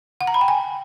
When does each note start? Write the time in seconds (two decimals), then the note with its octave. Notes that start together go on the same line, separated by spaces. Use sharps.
0.21 F#5
0.27 A#5
0.34 B5
0.41 G5
0.48 G#5